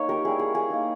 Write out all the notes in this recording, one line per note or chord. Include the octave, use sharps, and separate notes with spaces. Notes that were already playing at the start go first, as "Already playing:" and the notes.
Already playing: A#3 D#4 C#5
G4 A#4
G3 C#4 E4 G#4
G#4
G#4
A#3 D#4